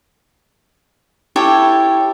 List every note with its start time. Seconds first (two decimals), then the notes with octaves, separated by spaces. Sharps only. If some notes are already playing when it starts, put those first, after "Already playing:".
1.36 E4 G4 A4 C#5